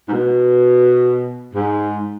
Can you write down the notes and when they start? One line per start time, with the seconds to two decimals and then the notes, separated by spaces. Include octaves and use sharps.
0.09 G#2
0.13 B2
1.54 G#2